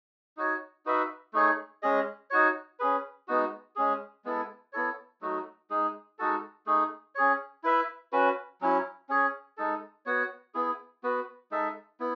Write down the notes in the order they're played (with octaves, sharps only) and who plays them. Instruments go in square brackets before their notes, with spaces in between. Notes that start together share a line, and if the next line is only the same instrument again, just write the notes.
[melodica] D#4 F#4 C#5
D#4 F#4 B4 E5
A3 D#4 G#4 C#5
G#3 C#4 G#4 D#5
D#4 F#4 C#5
C#4 G#4 B4
G#3 B3 D#4 F#4
G#3 C#4 G#4
G#3 B3 E4 A4
B3 E4 A4 C#5
F#3 A3 D#4 F#4
G#3 D#4 G#4
G#3 D#4 F#4 A4
A3 D#4 G#4
C#4 G#4 C#5
E4 B4 E5
C#4 F#4 B4
F#3 C#4 E4
C#4 G#4 C#5
G#3 D#4 A4
B3 F#4 C#5 F#5
B3 E4 G#4
B3 F#4 B4
G#3 D#4 A4 E5
B3 E4